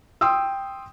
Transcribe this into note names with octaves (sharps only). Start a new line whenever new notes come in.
G5 C6 D#6 E6